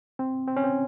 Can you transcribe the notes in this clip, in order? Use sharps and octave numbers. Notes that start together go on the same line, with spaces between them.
C4
C4
C#4
C4